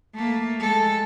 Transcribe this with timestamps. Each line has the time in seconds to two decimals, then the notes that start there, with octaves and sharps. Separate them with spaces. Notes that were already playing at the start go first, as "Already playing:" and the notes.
0.15 A3 A#3
0.60 G#3 A4